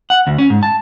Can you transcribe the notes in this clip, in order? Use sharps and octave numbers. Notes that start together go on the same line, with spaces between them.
F#5
D2
C#4
G#2
A5